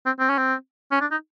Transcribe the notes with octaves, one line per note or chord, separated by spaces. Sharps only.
C4
C4
C#4
C4
C#4
D4
D#4